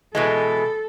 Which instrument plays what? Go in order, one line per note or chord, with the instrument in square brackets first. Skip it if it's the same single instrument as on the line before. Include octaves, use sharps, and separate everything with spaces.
[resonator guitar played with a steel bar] B2 E3 G#3 [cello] A4